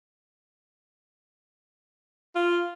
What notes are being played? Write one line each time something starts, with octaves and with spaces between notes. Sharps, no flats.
F4